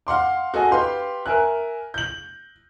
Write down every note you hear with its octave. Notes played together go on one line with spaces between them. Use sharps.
F5 F#5 C6 D6
F#4 A4 D#5 G#5
G4 B4 F5 C6
A#4 E5 G#5 F#6
G6 F#7